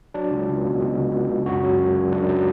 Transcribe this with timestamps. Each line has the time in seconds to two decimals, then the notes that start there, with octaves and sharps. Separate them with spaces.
0.14 F#3 D4
0.31 C#2
0.48 C#2
0.65 B2
0.81 B2
0.97 C#2
1.13 C#2
1.30 C#2
1.46 F#2 F#4
1.63 F#3
1.79 F#2
1.96 F#2
2.12 F#2 D4
2.29 F#3